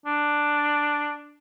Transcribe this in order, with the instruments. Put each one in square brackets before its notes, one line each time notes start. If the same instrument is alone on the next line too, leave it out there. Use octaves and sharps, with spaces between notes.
[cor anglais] D4